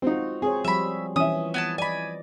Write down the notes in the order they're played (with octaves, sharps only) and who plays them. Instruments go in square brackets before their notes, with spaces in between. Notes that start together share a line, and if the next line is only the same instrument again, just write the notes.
[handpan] G#3 F4 F#4 [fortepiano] C4 D#4
[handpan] C4 C5 C#5 [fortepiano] G#4
[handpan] F3 G3 [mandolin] E5 B5
[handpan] E3 [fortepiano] C#4 E5 [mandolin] D#6
[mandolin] B3 G#5 A5
[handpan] D5 D#5 [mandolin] G#5 B5